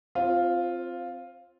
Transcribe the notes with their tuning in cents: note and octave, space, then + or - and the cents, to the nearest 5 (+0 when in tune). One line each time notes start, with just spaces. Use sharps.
C4 +0 F4 +0 C5 +45